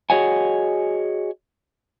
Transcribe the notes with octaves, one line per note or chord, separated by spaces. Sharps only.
F#4 G#4 C#5 D#5 F#5 G#5